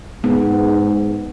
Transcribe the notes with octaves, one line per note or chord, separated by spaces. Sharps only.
G#2 B3